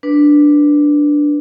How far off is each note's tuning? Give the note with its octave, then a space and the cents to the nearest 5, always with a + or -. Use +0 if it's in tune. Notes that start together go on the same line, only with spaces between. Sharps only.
D4 +0 B4 -5